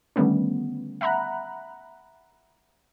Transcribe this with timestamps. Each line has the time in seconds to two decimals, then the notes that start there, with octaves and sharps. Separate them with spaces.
0.16 D3 D#3 G3 A3 B3 C#4
1.01 E5 F#5 A#5 B5 F#6